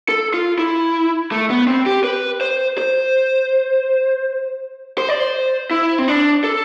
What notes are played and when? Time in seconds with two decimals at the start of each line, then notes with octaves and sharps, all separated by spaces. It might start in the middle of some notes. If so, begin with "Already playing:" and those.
0.09 A4
0.34 F4
0.59 E4
1.32 A3
1.50 B3
1.67 C4
1.86 G4
2.04 B4
2.41 C5
2.78 C5
4.98 C5
5.09 D5
5.20 C5
5.71 E4
5.99 C4
6.08 D4
6.44 A4